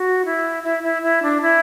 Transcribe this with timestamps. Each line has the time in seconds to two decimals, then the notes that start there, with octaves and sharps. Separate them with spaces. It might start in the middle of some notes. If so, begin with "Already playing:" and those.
Already playing: F#4
0.25 E4
0.64 E4
0.83 E4
1.02 E4
1.22 D4
1.41 E4